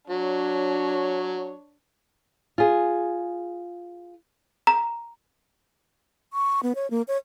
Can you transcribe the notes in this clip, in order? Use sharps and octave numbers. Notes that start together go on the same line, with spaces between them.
F#3 D4 C#5
F4 G#4
A#5
C#6
B3
C#5
A#3
C#5